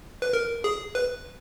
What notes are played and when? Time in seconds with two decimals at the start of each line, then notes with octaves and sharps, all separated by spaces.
0.22 B4
0.33 A#4
0.64 G#4
0.95 B4